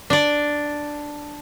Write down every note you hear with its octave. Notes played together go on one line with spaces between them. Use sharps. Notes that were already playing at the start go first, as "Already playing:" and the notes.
D4 D5